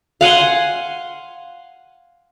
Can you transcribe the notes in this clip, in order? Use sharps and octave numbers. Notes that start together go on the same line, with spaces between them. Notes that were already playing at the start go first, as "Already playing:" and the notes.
F5 F#5 G#5 C6